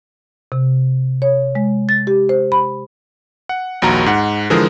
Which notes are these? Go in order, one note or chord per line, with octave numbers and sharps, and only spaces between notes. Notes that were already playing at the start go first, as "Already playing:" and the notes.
C3
C#5
G#3
A6
G4
C5
B5
F#5
A#1 D#2 F#4 A#5
G#2 F#5
D3 E3 F3 G#3 G#4 A#4